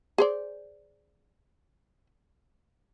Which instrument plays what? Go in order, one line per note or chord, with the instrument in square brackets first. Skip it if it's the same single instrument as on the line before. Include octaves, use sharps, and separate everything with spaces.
[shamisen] G#4 C5 D5